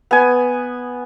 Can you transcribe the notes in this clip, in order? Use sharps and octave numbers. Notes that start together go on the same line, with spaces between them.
B3 G#5